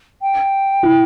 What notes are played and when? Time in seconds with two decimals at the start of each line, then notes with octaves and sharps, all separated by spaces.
0.22 G5
0.83 E4